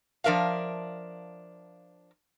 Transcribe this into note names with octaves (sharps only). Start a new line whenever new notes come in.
F3 D4 A#4 E5 F5